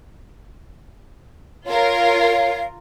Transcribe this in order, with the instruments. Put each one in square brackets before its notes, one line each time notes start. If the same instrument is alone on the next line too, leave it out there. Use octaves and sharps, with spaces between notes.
[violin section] F4 A#4 [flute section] C#5 F5